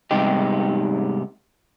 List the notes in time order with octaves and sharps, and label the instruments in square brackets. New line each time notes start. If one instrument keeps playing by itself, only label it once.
[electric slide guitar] G#2 C3 G3 B3 D#4 G4